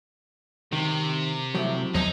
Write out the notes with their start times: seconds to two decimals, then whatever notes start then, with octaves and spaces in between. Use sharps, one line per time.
0.73 C3 D#3
1.55 F3 F#3 A3 E4
1.95 E2 F3 F#3 D#4